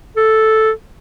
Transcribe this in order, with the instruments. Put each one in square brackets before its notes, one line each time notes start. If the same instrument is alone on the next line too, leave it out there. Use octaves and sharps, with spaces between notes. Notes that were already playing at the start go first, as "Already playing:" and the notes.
[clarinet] A4